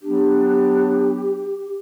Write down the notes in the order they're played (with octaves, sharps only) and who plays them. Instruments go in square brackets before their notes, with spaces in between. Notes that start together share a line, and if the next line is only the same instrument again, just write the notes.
[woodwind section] F#3 B3 D4 [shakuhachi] G4